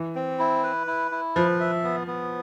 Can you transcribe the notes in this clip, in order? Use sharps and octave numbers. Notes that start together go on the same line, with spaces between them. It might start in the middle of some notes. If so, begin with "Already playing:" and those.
Already playing: E3
C4
E4
B4
E4
E4
F3 B4
E5
B3
B3